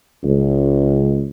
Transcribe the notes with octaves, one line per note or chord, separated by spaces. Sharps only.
C#2